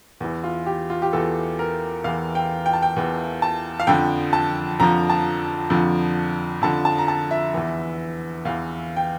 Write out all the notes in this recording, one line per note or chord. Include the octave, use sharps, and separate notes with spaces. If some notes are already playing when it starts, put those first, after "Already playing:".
E2 E3
F4
G4
F4
G4
E2 E3 A4
A#4
E2 E3 F5
G5
G5
A5
G5
E2 E3
A5
F5
F2 D3 F3 G5
A5
F2 D3 F3 A#5
A5
F2 D3 F3
F2 D3 F3 A5
A5
A#5
A5
E5
E2 E3
E2 E3 F5
G5